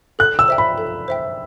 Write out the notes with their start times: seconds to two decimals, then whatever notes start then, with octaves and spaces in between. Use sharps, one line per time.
0.19 A4 F#6
0.39 E6
0.48 C5 E5 G5
0.58 B5
0.78 A4
1.08 C5 E5 G5